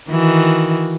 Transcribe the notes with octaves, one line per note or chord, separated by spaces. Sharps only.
D#3 E3 F#4